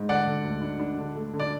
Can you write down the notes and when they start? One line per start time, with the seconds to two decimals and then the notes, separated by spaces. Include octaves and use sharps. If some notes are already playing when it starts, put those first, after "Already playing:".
Already playing: G#2
0.09 D3 D5 F#5
0.27 D3
0.45 D2
0.62 D4
0.80 D4
0.98 D3
1.15 A3
1.33 D3
1.39 D5